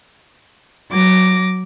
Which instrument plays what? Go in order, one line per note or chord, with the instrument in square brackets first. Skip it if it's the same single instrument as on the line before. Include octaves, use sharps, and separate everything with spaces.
[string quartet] F#3 D6 A#6